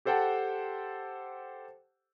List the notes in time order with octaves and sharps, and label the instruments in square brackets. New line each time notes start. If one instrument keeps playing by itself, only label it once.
[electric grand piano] G4 A4 C5 F#5 G5 A5